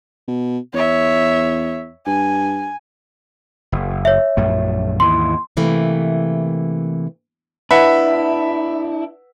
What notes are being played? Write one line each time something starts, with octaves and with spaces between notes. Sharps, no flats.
B2
E2 C#5 E5
G2 G#5
F#1
C#5 E5
A#1 F#2 A3
D#2 G#2 E3 C6
C3 E3 A3 A#3
D4 E4 B4 E5 F#5 B5